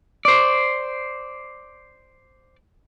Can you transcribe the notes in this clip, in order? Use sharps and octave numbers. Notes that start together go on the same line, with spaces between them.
C5 D5